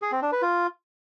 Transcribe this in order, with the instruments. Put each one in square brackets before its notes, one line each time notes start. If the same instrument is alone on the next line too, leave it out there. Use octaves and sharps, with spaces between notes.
[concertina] G#4
C4
D4
B4
F4